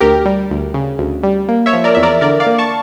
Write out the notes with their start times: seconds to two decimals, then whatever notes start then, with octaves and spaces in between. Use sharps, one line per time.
0.01 D2 G4 A#4
0.26 G3
0.50 D2
0.74 C#3
0.99 D2
1.23 G3
1.48 A#3
1.66 C#5 E5
1.73 F3
1.84 A#4 D5
1.95 E2 E5
2.03 A#4 D5
2.21 D3 A#4 D5
2.40 D5 F5
2.47 A#3
2.58 A5 C#6